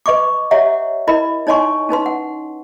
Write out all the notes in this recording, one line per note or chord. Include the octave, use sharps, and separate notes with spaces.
B4 D#5 C#6 D6
G4 C#5 D#5 E5 F#5 A#5
E4 A#4 D#5 B5
D#4 C#5 D#5 G#5 C6 C#6
C#4 D#4 B4 C6
F#5